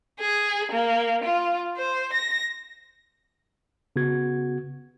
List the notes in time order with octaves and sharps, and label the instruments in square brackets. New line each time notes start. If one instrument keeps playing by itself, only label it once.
[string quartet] G#4
A#3
F4
C5
A#6
[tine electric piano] C#3 B3 F#4 G#6